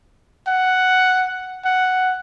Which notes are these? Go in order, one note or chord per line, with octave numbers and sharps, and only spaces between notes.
F#5
F#5